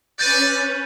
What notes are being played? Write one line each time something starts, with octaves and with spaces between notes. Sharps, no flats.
C#4 F#4 B4 D5 G6 A6 D#7